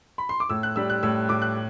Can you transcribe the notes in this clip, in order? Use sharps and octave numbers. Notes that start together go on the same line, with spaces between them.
B5
C6
D6
A2 E6
F#6
G3 E6
F#6
A2 E6
A2 D6
F#6